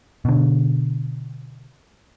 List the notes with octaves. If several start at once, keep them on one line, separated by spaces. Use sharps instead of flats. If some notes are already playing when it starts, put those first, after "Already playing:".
B2 D3